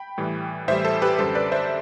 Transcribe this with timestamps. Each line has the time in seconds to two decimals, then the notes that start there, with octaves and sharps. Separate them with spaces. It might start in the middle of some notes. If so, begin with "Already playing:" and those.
Already playing: G5 B5
0.18 A2 E3 G3
0.68 A2 E3 G3 C5 E5
0.85 A4 C5
1.02 G4 B4
1.18 F#2 D3 G3 A4 C5
1.35 B4 D5
1.52 C5 E5